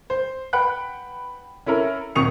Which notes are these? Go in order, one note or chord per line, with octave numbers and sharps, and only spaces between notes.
C5
B4 F#5 G5 B5 F#6
C#4 E4 A4 A#4
D#1 G#1 C#6 D#6 C#7 F7